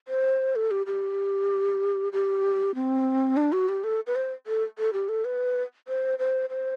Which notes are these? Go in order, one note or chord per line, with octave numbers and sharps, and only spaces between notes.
C5
A4
G4
G4
G4
C4
D4
F#4
G4
A4
B4
C5
A4
A4
G4
A4
B4
C5
C5
C5